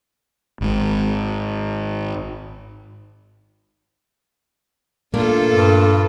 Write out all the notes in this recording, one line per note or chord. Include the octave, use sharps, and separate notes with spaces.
G#1 G#2
A#2 A3 A#3 D4 F4 A4
G2